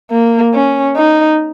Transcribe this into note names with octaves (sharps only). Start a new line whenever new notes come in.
A#3
C#4
D#4